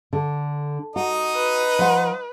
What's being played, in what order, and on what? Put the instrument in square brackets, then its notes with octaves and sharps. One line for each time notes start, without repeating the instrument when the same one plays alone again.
[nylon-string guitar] D3
[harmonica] D#4 D#5 D#6 [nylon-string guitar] F#4
[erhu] B4
[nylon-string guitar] F3 F#5